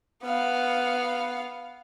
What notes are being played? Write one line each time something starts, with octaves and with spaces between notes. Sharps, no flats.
B3 F5